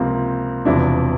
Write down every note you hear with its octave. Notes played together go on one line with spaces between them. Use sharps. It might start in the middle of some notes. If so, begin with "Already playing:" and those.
Already playing: C#2 C3 F3 A#3 C4
E1 E2 C3 F3 D4 E4